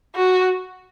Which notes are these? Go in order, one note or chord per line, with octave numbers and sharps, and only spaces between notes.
F#4